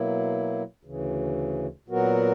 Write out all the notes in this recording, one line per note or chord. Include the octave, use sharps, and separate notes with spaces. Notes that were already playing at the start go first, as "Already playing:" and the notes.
Already playing: B2 F#3 A#3 E4
D2 C#3 E3
A#2 F#3 B3 F#4 A#4